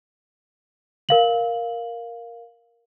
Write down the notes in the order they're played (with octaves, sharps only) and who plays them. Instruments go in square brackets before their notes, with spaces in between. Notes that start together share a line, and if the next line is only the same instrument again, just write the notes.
[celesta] A#4 F5 F#7